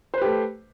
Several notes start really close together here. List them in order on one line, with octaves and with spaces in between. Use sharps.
C5 B4 G4 A3